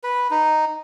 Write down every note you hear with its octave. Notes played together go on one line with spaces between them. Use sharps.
B4
D#4